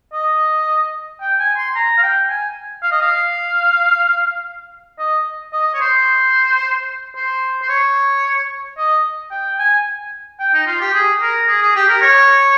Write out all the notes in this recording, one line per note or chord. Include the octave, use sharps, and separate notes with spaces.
D#5
G5
G#5
C6
A#5
F5
G5
G#5
F5
D#5
F5
D#5
D#5
C#5
C5
C5
C5
C#5
D#5
G5
G#5
G5
D#4
F4
G4
G#4
A#4
G#4
G#4
G4
A#4
C#5